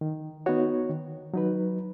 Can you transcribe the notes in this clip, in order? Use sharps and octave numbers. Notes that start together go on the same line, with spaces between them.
D#3
B3 D#4 F#4 C#5
D#3
F#3 D#4 B4